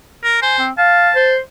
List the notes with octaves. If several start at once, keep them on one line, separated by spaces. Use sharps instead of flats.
A#4
C5 G#5
C4
F5 A5
C5